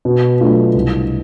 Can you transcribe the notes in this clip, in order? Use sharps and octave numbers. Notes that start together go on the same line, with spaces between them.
B2
F#3 A3 D4 F4
C2